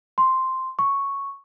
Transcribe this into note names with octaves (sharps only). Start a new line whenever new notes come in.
C6
C#6